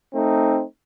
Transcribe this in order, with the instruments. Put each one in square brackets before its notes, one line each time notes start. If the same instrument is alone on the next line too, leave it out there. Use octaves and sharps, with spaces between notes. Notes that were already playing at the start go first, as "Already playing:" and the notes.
[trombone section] A3 C4 D#4